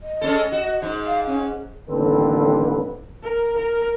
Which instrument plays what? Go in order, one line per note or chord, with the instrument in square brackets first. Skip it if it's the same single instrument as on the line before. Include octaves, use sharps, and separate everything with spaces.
[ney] D#5
[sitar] G#3 C#4 A4
F#4
G#2
[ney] F5
C#4
[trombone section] A1 D#2 D3 G3 C4 B4
[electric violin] A#4
A#4